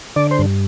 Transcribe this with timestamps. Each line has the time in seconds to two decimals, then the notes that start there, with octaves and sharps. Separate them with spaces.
0.16 D3 D5
0.31 C5
0.39 G2